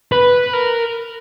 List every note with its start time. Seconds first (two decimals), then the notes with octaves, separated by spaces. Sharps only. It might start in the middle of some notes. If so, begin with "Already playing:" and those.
0.12 B4
0.53 A#4